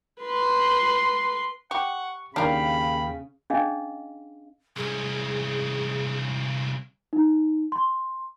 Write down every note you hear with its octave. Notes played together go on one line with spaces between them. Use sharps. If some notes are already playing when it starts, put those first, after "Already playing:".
B4 C6
G4 F#5 C#6
D#2 C#3 D4 A#4 F5 G5 B5
C#4 D4 G#4 D#5 F5
C2 C#4 G#4
D#4
C6